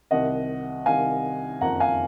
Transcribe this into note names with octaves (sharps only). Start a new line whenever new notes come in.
C2 C3 D#3 D#5 F#5
C2 C3 D#3 F5 G#5
F#1 F2 D#3 F#5 A#5
F5 G#5